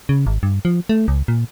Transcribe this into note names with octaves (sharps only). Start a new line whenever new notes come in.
C#3
G#1
G2
F3
A3
C#2
A#2